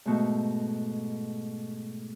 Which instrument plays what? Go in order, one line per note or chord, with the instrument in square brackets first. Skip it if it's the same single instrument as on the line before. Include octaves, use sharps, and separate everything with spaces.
[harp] G#2 B2 A3